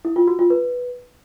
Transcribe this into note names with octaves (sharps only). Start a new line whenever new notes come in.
E4
F4
F#4
F4
B4